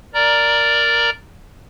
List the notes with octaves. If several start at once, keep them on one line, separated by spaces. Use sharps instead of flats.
A#4 D5 A#5